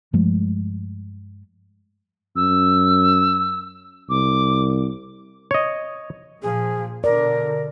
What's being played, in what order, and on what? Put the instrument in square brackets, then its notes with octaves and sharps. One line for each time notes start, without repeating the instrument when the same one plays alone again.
[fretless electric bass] G2 F3 G#3 A3
[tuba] F#2 [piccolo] E6
[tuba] C2 [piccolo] D6
[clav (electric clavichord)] C#5 D#5
[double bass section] A#2 F3 [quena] G#4
[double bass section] B2 D3 [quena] A#4 [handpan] D5